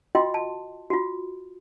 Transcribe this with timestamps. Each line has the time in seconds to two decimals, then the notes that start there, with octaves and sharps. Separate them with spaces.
0.15 F4 F#4 D#5 G5 C6
0.34 A5
0.90 F4 F#4